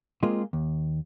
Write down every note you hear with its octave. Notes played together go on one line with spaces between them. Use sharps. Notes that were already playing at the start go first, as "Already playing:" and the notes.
G#3 A#3 C4 F4 G#4 D#5
D#2